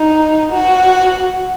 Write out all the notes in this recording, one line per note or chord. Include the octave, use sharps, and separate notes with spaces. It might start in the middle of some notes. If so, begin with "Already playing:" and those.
Already playing: D#4
F#4